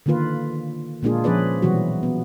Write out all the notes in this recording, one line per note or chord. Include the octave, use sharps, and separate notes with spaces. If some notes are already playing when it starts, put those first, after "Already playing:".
D3 D#3 A#3 F4 B4
A#2 G#3 A#3 D4 F4 G#4
F3 C#4 G#4 B4 D5
B2 E3 F#3 G3 F#4
B3